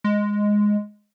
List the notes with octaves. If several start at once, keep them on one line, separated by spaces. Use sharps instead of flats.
G#3